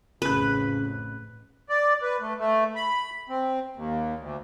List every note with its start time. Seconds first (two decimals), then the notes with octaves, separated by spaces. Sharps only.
0.22 A1 F2 C#3 B4 F#6
1.69 D5
2.02 B4
2.20 A3
2.39 A3
2.76 B5
3.30 C4
3.75 D#2
4.19 D2